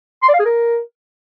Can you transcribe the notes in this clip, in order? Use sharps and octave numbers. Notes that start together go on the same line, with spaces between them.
C6
D5
F5
G#4
A#4